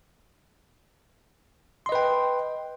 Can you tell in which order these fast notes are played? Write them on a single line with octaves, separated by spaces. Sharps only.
C6 D#5 B4 G5